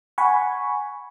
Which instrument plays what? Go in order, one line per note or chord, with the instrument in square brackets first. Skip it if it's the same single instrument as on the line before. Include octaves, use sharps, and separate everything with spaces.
[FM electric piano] F#5 G#5 B5 C#6